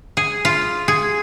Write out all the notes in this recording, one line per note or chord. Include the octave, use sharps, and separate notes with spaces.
G#4
F4
G#4